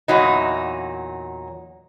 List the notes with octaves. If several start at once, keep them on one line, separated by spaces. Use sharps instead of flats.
E2 A#2 F#3 D#4